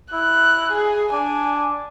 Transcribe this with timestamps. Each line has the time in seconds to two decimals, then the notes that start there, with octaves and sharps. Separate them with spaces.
0.13 E4 F#6
0.72 G#4
1.13 D4 G#5